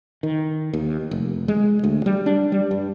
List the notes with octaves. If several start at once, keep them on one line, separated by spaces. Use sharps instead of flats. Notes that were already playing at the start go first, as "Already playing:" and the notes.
D#3
D#2
F1
G#3
D2
G3
D4
G3
G2